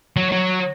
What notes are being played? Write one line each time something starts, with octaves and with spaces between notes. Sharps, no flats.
F#3
F#3